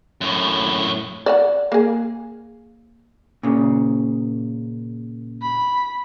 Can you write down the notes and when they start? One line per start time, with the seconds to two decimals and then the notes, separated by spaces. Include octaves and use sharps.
0.21 F#2 A2
1.26 D5 E5 F#5
1.72 A#3 G#4
3.43 A#2 C#3
5.42 B5